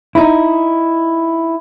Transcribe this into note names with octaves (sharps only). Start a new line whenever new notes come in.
D#4 E4